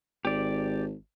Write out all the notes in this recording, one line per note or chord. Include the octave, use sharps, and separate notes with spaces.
G#1 G4 D5